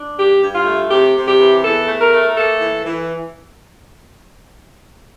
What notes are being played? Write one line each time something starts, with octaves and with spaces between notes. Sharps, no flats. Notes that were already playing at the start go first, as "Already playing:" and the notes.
Already playing: D4
G2 G4
G2
F4
A3
C3 G4
C3
G4
E3
E2 A4
A3
A#4
A3
A#3 A4
E3
E3